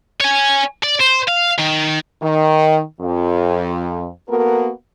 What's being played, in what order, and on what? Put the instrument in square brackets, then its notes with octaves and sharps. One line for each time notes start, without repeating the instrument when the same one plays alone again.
[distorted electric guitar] C#5 G#5
D5
C5
F5
D#3
[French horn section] D#3
F2
A#3 B3 F#4 A4 A#4